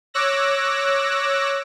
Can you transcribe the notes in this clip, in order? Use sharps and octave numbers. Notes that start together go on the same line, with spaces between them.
C#5 D6 E6 F#6 A#6